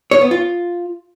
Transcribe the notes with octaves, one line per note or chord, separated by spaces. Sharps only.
C#5
B3
F4